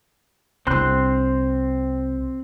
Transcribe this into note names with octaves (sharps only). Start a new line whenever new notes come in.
C2 C4 D4 C6 F#6